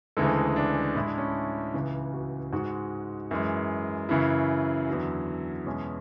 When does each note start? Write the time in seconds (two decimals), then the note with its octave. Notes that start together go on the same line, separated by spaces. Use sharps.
0.17 D2 C#3 E3 G#3 A4
0.56 D4
0.95 A2 G#3 E4
1.06 D4
1.18 C#4
1.29 D4
1.74 C#2 C#3 E3
2.13 F#4
2.53 G#2 G#3 F#4
3.31 F#2 E3 G#3
4.09 F#2 C#3 E3 E4
4.88 E2 D3 F#3
5.67 E2 B2 G#3 C#4